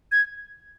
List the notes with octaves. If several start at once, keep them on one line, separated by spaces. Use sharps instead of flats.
G#6